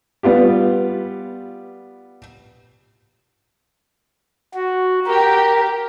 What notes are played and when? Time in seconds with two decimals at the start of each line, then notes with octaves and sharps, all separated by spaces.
0.23 G3 B3 F4 G4
4.54 F#4
5.07 G4 A#4